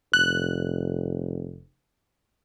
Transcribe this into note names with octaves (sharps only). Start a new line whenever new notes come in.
F1 F#6